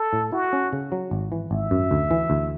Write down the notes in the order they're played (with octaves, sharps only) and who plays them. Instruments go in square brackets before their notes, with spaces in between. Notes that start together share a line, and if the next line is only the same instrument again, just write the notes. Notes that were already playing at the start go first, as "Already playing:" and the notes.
Already playing: [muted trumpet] A4
[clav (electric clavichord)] A2
[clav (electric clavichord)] E4 [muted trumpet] F#4
[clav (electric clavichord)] C#4
C#3
F#3
G#1
E3
[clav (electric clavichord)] G#1 [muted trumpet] E5
[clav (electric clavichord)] F#2
D2
E3
D2